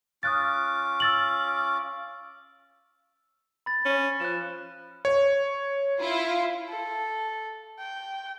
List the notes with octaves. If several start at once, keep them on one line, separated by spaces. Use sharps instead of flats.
C#4 F4 D6 D#6 F#6 A6
E6 A6 F#7
B5 A6
C#4
F3 F#6 E7
C#5
E4 F4
A4
G5